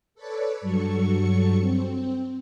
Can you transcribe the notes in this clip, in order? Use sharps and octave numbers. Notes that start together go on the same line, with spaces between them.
A4 B4 C#5 D5
G2 F#3 A4 C#6 C#7
C4